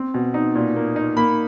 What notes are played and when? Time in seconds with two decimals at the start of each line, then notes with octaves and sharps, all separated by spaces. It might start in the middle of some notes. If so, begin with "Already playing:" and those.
Already playing: C4
0.14 B2
0.34 D#4
0.55 A#2
0.76 A#3
0.96 D#4
1.17 A#3 B5